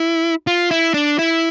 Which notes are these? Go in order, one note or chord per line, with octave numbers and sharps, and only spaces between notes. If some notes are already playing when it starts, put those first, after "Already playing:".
Already playing: E4
F4
E4
D4
E4